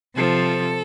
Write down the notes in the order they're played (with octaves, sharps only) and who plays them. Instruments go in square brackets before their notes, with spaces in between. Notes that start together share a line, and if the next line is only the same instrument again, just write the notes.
[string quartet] C3 F3 A4